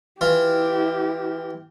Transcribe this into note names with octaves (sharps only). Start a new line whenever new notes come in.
E3 E4 F4 G4